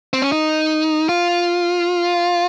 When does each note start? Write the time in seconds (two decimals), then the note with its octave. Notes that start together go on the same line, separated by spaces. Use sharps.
0.13 C4
0.22 C#4
0.32 D#4
1.09 F4